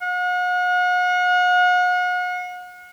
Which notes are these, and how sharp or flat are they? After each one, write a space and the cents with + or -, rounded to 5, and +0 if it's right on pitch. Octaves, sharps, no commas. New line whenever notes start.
F#5 -40